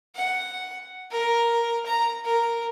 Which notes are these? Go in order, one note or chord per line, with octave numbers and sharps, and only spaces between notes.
F#5
A#4
A#5
A#4